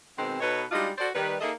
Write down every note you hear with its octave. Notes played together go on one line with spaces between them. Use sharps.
B2 D#3 G#3 C4
B2 D#4 A4 B4 C#5 D#5
G3 G#3 D4 D#4 F4 F#4
F#4 A4 C5 D5
D#3 G3 B4
A#3 D#4 G#4 A4 D#5 E5